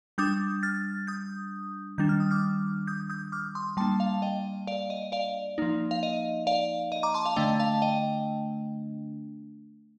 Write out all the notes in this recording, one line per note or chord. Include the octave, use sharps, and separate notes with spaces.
G3 D4 D#6 G6
F6 A6
D#6 G6
D#3 G3 D4 G6
F6
D#6
D6 F6
D#6 G6
D#6 G6
D6 F6
C6 D#6
G3 A#3 D4 A5 C6
F5 A5
D#5 G5
D5 F5
D#5
D5 F5
F3 A#3 D#4
F5
D#5
D5 F5
D#5
A#5 D6
A5 C6
F5 A5
D3 A3 D4 D#5 G5
F5 A5
D#5 G5